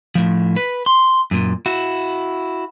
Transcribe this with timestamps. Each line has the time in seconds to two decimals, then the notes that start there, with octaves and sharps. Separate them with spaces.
0.15 A2 F3
0.56 B4
0.86 C6
1.31 F#2 A#2
1.66 E4 F#4